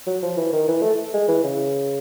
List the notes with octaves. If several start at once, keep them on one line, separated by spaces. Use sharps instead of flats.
F#3
F3
E3
D#3
E3
A3
G#3
E3
C#3